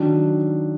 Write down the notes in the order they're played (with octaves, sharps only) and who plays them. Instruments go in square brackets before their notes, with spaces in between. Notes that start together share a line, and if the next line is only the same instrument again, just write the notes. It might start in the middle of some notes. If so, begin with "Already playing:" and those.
Already playing: [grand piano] D#3 F#3 D4